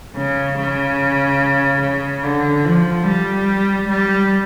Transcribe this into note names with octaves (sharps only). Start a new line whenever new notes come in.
C#3
C#3
C#3
D3
F3
G3
G3